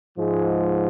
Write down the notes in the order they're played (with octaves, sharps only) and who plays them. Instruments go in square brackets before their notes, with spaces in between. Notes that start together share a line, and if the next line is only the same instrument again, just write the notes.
[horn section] G#2 F3 G#3